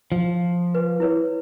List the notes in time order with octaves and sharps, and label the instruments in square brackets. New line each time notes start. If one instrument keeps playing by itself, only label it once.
[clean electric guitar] F3
[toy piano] B4
E4 B4 C#5